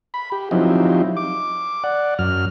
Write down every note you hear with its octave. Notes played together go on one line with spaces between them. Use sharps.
B5
G4
F3 F#3 C4 D#4 E4 G4
D6
D5 F#5
F#2 F6